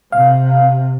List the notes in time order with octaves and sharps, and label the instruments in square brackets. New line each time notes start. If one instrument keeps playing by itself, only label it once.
[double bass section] C3 [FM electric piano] F5